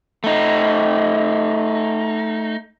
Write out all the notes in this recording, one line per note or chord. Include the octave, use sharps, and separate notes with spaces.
A3 D#4